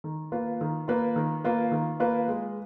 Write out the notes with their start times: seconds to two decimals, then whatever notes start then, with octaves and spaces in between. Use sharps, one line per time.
0.04 D#3
0.32 A#3 F4 B4
0.61 D#3
0.88 A#3 F4 B4
1.16 D#3
1.44 A#3 F4 B4
1.72 D#3
2.00 A#3 F4 B4
2.28 G#3